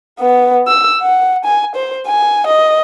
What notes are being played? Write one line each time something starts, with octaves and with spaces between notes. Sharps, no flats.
B3
E6
F#5
G#5
C5
G#5
D#5